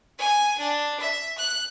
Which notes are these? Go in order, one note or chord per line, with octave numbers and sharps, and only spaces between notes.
G#5
D4
E5
F#6